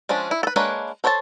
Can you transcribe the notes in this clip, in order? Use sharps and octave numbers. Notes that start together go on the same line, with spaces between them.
F3 G#3 C#4 D4
E4
A4 B4
G#3 A#3 D4 B4 C#5
A4 C5 C#5 F#5 A5